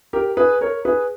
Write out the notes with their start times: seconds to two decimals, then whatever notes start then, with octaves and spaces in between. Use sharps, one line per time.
0.13 G4 A#4
0.37 G#4 B4
0.61 A#4 C#5
0.85 G#4 B4